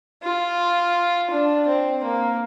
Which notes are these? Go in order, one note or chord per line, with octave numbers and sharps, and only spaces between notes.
F4
D4
C4
A#3